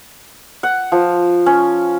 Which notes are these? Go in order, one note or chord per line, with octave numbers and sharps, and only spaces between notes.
F#5
F3
C#4